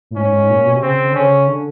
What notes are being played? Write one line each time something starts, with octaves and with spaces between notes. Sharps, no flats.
A2
G#2 C#4
G#2
A#2
B2
C3
C#3 C4
C#3
D3
C#3 C#4
D3